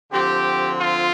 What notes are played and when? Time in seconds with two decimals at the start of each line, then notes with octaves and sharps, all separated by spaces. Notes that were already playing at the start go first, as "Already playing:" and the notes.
0.13 D3 F3 C4 G4
0.79 F4